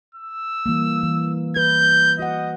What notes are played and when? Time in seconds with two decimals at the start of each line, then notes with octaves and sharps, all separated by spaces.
0.15 E6
0.66 E3 G3 A#3
1.03 E3
1.56 B4 G6
2.19 F#4 D#5 F#5